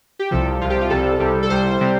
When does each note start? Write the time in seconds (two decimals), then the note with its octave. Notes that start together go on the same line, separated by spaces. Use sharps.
0.19 G4
0.31 C2 C3 F3 A4
0.61 C2 C3 F3 F4
0.70 G4
0.81 F4
0.90 C2 C3 G3 A4
1.20 C2 C3 G3
1.43 A4
1.50 C2 C3 G3 C5
1.81 C3 G3